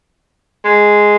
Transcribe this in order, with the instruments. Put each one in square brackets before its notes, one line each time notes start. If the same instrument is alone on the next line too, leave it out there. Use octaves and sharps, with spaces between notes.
[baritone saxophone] G#3